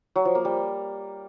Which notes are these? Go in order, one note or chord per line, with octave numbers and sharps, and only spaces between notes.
F#3
F3
A#3
G3